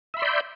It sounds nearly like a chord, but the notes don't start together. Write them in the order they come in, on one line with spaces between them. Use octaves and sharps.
E5 B5 C6 D5 G6